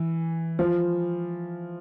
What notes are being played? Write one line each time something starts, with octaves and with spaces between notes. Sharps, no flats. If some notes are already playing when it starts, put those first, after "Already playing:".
Already playing: E3
F3